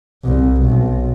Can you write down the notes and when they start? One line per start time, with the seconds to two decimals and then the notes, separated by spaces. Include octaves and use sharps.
0.25 C2
0.62 B1